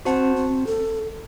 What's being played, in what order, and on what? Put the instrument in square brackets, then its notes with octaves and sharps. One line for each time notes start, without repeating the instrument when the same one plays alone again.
[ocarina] C4 [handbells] F#4 C5 F#5 A5
[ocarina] C4
A4